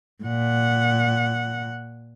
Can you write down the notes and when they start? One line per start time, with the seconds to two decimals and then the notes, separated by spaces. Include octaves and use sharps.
0.24 A#2 F#5